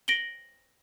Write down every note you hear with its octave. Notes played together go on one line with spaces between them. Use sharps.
A#6 D7 F#7 G7